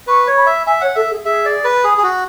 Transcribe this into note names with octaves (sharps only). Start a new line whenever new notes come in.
B4 C#6
C#5
B5
E5
E5 G#5
C#5 F#5
A4 E5
G#4
G#4 E5
D5
B4
G#4
G#4
F#4